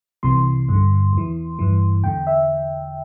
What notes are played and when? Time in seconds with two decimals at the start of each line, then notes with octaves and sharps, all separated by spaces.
0.23 C2 C3 E3 C6
0.69 G2 D3
1.13 E2 E3
1.59 G2 E3
2.04 E2 D3 G5
2.27 E5